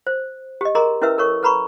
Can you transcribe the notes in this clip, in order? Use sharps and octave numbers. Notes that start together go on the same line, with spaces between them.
C5
G4 D#5
G#4 A#4 D#5 A#5 C6
C#4 E4 A#4 B4 E5 E6
A4 A#4 C#5 C#6
A4 B4 A#5 B5 C#6